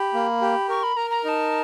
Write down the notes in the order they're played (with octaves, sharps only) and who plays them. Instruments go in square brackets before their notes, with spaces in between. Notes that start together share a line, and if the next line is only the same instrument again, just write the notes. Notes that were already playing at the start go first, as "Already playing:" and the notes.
Already playing: [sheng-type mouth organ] G4 [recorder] B5
[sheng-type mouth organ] A#3
G4
[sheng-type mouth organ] A#4 [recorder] C#6
[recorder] B5
[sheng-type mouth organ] A#4 [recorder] A#5
[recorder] A#5
[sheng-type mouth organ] D#4 [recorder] A5 A#5